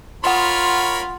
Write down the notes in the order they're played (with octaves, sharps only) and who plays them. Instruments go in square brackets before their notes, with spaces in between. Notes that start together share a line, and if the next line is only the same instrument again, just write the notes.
[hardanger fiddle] F4 [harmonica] A#4 C#5 B5 [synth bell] F#5 C6